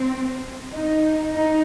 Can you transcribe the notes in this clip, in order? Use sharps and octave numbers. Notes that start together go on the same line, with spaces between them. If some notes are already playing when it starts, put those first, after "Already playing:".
Already playing: C4
D#4
D#4